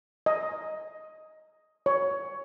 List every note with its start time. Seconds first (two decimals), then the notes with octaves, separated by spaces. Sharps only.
0.26 D#5
1.86 C#5